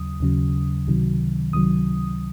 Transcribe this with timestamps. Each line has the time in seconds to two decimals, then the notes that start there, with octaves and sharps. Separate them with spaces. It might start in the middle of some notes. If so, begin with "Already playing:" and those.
Already playing: D#2 C#3 F#3 D#6
0.20 D#2 C#3 F#3
0.87 C#2 C3 D#3 F#3
1.53 C#2 C3 D#3 F#3 D#6